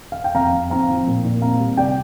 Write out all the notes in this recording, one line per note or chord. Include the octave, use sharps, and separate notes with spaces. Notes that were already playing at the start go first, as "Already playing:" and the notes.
F5
G5
F2 F5 A#5
F2
C4 F5 A#5
F3
A#2
A#2
C4 F5 A#5
G3
C3 D5 G5